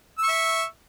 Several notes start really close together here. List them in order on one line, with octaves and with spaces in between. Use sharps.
E6 C#6 E5